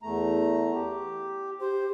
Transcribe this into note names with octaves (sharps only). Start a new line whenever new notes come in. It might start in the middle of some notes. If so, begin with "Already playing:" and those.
E2 A3 A#5
G4
G4 C5